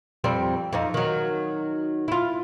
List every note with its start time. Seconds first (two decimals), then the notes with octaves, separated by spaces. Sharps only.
0.24 F2 G3 C4
0.73 F2 F3 D#4
0.94 D#3 F#3
2.08 E4 F4